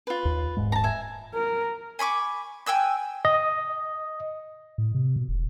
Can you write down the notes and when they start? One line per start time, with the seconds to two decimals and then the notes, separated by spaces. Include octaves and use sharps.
0.07 F4 B4
0.25 D#2
0.57 D#1 G#2 G#3
0.72 A5 A#5
0.84 E5 G#5
1.34 A#4
1.99 G#5 B5 C#6 D6
2.66 G5 G#5 E6 F#6
3.25 D#5
4.78 A2
4.95 C3
5.16 B2
5.29 E1